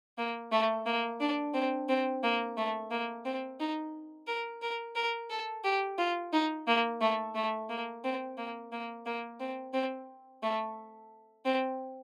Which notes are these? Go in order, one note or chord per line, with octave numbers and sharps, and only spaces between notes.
A#3
A3
A#3
D4
C4
C4
A#3
A3
A#3
C4
D#4
A#4
A#4
A#4
A4
G4
F4
D#4
A#3
A3
A3
A#3
C4
A#3
A#3
A#3
C4
C4
A3
C4